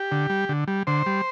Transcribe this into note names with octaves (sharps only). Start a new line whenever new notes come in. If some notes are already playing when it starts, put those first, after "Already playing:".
Already playing: G4
D3
G3
D3
G3
D3 C5
G3